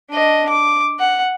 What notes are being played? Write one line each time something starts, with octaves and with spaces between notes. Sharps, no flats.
D4 D#5
D6
F#5